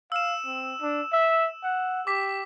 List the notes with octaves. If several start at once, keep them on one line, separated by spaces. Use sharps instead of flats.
F5 E6 E7
C4
D4
E5
F#5
G4 D6 B6